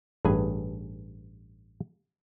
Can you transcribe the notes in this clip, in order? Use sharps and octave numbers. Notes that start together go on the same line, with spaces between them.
A1 G2 G#4 B4 G#5